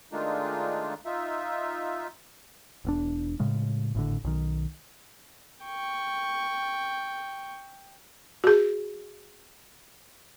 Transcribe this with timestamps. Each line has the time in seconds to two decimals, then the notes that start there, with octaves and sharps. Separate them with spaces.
0.12 D#3 G#3 A3 D4 D#4 F4
1.05 D#4 F4 E5
2.85 E1 E2 D4
3.40 A2 C#3 G#3
3.95 G#1 A2 D3
4.24 B1 D#3
5.65 G5 C#6
8.44 F#4 G#4